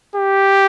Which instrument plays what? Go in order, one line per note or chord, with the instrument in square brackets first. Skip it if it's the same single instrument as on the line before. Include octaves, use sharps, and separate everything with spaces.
[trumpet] G4